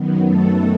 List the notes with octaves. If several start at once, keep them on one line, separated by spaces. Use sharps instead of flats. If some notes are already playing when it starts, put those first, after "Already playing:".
Already playing: F#2 D#3 F#3 B3
A3 A4